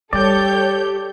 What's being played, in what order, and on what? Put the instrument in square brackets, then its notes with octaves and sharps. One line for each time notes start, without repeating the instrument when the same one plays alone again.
[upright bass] G3 [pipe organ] G4 [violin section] A4 C#5 G6 [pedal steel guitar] D5 G5